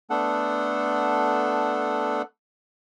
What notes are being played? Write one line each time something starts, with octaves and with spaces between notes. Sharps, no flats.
A3 B3 D4 A4 F#5